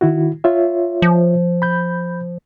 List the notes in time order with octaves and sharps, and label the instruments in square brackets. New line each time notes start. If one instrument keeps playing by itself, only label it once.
[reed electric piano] D#3 E4 F#4
F4 C#5 E5
[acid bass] F3
[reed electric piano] B5 G6